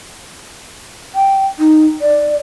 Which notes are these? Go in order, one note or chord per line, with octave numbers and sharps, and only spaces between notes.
G5
D#4
D5